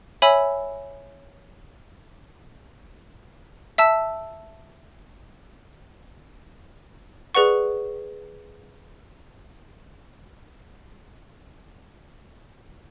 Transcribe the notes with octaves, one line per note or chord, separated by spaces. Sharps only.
C#5 E5 G#5 B5 E6
E5 A5 E6
G#4 B4 D5 F#5 C#6